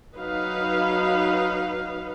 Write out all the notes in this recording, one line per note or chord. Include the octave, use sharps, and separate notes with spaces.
F#3 D#4 B4 F5